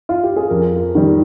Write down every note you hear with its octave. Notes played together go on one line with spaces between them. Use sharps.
F4
G4
G#4
F2 A#4
D#3 G3